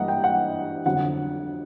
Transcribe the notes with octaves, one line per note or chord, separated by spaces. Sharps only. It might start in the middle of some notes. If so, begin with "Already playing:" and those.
Already playing: G2 E3 G3 A#3 D#5 F#5
G5
F#5
G1 F2 D3 F#3 F#5